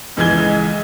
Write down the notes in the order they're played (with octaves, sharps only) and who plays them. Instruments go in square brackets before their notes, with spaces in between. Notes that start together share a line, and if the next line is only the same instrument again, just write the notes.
[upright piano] C#2 E3 G#3 G#5 G#6 G7